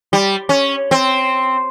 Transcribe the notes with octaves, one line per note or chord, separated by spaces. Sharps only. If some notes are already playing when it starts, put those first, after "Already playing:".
G3
C#4
C4